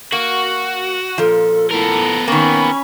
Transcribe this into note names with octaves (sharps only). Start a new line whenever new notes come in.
A#3 F#4
A#2 F3 A4
B3 E4 A4 A#4
D#3 A#3 C#4 B5 C#6